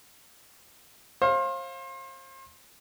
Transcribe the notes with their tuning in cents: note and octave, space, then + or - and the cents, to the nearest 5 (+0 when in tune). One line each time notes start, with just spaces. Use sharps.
C5 +35 F5 +5